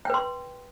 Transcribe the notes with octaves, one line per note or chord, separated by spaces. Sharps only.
B4 G5 C6